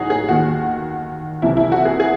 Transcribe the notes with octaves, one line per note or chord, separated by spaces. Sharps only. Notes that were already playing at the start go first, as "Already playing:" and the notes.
Already playing: A1 E3 C#4 D#4 F#4 G#4
G#4
D#2 D#3 F#4
C2 C3 E3 E4
E4
F#4
G#4
G#4